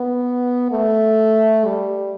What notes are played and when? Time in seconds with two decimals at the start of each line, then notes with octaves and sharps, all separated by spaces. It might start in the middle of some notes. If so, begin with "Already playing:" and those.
Already playing: B3
0.71 A3
1.65 G3